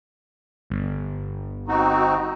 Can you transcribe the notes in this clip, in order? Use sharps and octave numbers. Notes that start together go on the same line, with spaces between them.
G1
C4 D#4 F#4